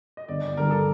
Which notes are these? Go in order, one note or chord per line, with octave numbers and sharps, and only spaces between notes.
D#5
G1 D5
D5
G2 D3 A#4
A4